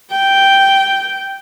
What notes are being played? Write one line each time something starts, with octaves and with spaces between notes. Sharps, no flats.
G5